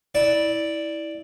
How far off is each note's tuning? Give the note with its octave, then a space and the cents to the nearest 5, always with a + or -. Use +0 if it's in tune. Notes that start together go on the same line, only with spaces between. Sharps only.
E4 -20 D5 +0